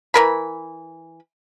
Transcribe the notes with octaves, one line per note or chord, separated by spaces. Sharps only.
E3 A#4 B5